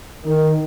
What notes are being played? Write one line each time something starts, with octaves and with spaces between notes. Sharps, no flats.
D#3